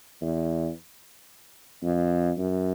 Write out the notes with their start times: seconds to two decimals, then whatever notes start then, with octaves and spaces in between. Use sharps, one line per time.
0.21 E2
1.83 F2
2.38 F#2